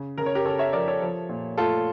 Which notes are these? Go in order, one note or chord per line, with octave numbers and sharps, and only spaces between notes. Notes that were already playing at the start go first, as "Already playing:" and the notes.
Already playing: C#3
C#3 A#4
C#5
G4 A#4
C#3 A4 C#5
C#5 E5
F3 A#4 D5
A4 C#5
F3
A#2
A3 F4 A4